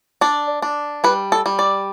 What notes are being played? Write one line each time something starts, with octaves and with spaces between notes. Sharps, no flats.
D4 D5
D4
G3 B4
A4
G3
D5